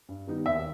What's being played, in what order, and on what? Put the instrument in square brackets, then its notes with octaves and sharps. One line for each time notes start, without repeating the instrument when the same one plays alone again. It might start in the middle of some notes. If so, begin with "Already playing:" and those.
[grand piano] G2
D#3 G3 B3 D#4
[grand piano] D#2 [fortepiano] E5